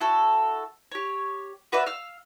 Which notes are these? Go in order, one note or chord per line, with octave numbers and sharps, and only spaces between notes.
E4 F#4 A4
G4 C#5
F#4 B4 D5 E5
F5 E6 F6